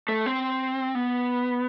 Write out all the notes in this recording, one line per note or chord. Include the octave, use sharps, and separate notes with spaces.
A3
C4
B3